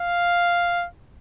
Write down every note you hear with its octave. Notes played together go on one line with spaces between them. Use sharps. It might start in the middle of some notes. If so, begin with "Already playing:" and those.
Already playing: F5